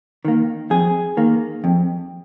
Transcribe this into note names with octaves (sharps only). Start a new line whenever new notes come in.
D#3 A#3
F2 G#4
D#3 A#3
F2